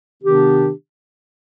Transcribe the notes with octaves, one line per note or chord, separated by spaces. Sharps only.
C3 D#3 B3 D4 G4